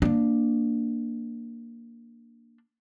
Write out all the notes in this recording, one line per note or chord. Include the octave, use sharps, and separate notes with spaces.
A#3 D4